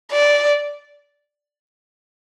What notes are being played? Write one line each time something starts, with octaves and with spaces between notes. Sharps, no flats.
D5